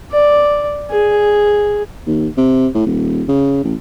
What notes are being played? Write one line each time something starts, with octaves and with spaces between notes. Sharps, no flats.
D5
G#4
D#2
C3
A2
D#1
C#3
A1